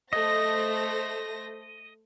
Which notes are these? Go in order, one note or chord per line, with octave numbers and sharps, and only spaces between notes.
A3 C5 D#5 A#6